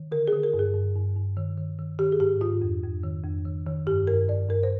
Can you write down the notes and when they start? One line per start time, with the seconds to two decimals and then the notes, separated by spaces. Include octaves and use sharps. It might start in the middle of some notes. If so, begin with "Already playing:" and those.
Already playing: D#3
0.12 D3 A#4
0.28 G#4
0.33 D3
0.43 A#4
0.54 G2
0.59 G#4
0.74 G2
0.95 G2
1.16 G2
1.37 D#3
1.58 D#3
1.79 D#3
1.99 D#3 G4
2.12 G#4
2.20 G#2 G4
2.41 G#2 F4
2.62 F2
2.83 F2
3.03 D#3
3.24 F2
3.45 D#3
3.67 D#3
3.87 G2 G4
4.07 G2 A#4
4.29 G2 D5
4.49 G2 A#4
4.63 C5